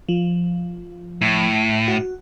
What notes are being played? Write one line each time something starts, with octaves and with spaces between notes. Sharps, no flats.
F3
A2
F#4